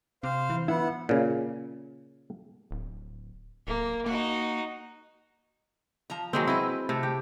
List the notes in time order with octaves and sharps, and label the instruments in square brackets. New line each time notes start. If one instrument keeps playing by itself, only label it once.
[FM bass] C3 [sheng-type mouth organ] C5 F5
[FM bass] E3
[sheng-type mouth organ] B3 F#5 [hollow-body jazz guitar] E4
[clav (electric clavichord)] A#2 C#3
[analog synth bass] D1
[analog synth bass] D1 [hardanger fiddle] A#3
[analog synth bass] A#3 [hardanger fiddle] D#4 F#4
[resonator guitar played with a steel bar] F3 A#5
[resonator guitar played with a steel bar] D#3 E3 A#3 [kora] F#3 G#3 C4
[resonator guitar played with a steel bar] C4 B4 [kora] E4
[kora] C3 [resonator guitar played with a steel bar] A3
[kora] G4